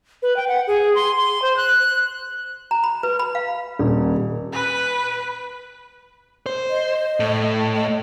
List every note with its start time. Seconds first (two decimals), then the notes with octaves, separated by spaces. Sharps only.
0.23 B4
0.37 G5
0.48 F#5
0.67 G#4
0.95 C6
1.17 C6
1.42 C5
1.57 F#6
2.71 A#5
2.84 B5
3.03 B4
3.19 B5
3.35 F5
3.79 D#1
4.52 B4
6.46 C5
6.70 D#5
7.20 A2
7.76 D#5